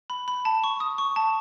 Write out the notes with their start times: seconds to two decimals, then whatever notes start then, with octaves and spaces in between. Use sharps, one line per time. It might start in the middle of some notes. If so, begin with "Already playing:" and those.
0.10 B5
0.28 B5
0.45 A5
0.64 C#6
0.80 D#6
0.98 C#6
1.16 A5